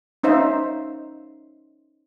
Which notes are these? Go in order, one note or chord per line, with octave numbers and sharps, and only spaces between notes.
C#4 D#4 C5 E5 F5